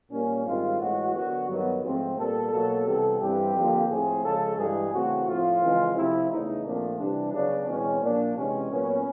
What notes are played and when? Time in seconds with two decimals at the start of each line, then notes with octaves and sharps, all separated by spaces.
0.11 A#2 G3 A#3 C#4
0.45 G#2 D#3 G3 C4 F4
0.80 A2 E3 G#3 F#4
1.14 F#2 D3 F#3 B3 F#4
1.48 G2 D#3 F#3 B3
1.83 G#2 F3 A3 C4
2.17 A#2 G3 B3 A4
2.52 B2 F#3 A#3 A4
2.86 C3 E3 G3 B3 A4
3.21 G2 E3 G3 C4 G4
3.55 F2 D3 F3 A#3
3.89 A2 F3 A3 C4 G#4
4.24 C#3 F3 G#3 A4
4.57 G2 E3 G#3 G#4
4.92 C#3 E3 A3 C4 F#4
5.27 A2 F3 A3 C4 F4
5.61 F2 C#3 E3 G#3 C4
5.95 C3 F3 A3 C4 E4
6.30 E2 C#3 E3 A3 D#4
6.65 A#2 F3 A3 C4 D4
6.98 C3 E3 G3 D4
7.33 C#3 F#3 B3 D4
7.68 E2 B2 G#3 C4 C#4
8.02 A#2 F3 A#3 D4
8.36 C3 E3 G#3 C#4
8.71 A#2 F#3 B3 C#4